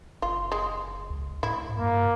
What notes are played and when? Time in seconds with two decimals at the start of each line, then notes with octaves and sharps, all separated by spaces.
0.22 F#1 F4
0.52 G#3
1.10 C#2
1.43 A2 E4
1.78 G2 A#3